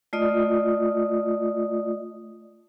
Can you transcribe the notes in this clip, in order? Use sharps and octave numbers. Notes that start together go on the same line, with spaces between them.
A3 F4 D5 D#5 D#6